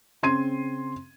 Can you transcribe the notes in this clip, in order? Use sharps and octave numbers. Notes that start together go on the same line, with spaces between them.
C#3 C4 C6 G#6 D#7